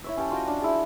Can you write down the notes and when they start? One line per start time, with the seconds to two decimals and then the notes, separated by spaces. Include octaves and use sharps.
0.04 E4 C#5 E5
0.17 C#4 G4 A5
0.31 F4 F#4 D#5 G5
0.47 D4
0.61 E4 G#4